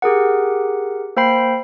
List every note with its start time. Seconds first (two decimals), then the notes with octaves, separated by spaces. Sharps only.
0.02 G4 G#4 A#4 F#5
1.16 A#3 C5 G5 B5 C7